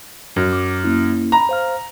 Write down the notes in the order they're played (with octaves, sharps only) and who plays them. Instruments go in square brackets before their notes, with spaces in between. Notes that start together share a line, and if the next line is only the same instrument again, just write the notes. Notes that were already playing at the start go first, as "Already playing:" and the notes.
[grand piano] F#2 [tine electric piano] F#3
[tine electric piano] D6
A#3 C#4 E4
[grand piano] A#5 [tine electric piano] B5
[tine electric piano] C5 F5 F6